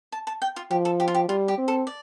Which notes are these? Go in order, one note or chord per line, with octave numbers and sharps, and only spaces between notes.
A5
A5
G5
F4
F3 G4
A4
G4
F4
G4
G3 F4
G4
C4
A4
D5